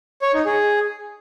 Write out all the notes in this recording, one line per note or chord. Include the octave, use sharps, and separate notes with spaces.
C#5
D#4
G#4